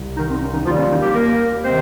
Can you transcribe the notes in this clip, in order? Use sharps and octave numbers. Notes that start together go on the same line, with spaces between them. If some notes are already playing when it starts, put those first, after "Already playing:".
Already playing: C2 C3
D#3 D#4
C4
C#4
D#3 D#4
D#2 D#3 F3 G3 F4
C#4
D#3 D#4
G3 G4
A#3 A#4
C3 D#3 G#3 C4 C5